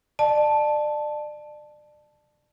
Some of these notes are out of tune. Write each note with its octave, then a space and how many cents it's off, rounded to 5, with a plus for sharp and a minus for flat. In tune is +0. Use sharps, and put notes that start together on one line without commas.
D5 +30 A5 -5